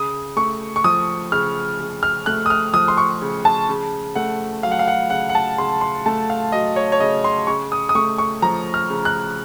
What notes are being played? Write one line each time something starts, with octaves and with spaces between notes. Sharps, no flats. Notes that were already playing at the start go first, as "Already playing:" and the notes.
Already playing: C#3 D#6
A3 C#6
C#6
F3 D#6
C#3 F6
C#3
F6
A3 F#6
D#6
F6
F3 D#6
C6
C#6
C#3
A5
C#3
A3 F#5
F#3 F5
F#5
F5
F#5
C#3 F#5
F#5
A5
C#3 C6
C6
A3 A5
F5
F#3 D#5
C#5
C#5
C#3 D#5
C6
C#3 C#6
D#6
D#6
A3 C#6
C#6
F3 A#5
F6
C#3
F#6